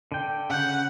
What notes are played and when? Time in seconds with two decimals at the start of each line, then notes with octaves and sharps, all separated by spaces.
0.12 D3 G5
0.50 C#3 F#5 G6